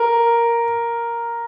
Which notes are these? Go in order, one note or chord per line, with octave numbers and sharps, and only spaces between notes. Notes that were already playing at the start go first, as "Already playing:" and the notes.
Already playing: A#4